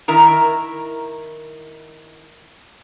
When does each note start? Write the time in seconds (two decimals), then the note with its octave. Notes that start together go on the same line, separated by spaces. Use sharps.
0.08 D#3 E4 A#4 A#5